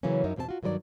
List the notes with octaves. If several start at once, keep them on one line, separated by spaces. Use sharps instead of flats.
C#3 E3 F#3 A#3 C#4
F#2 C#4 D#4 A#4 E5
E2 B2 C4 A4 A5
F4 F#4
G2 D#3 F#3 B4 D5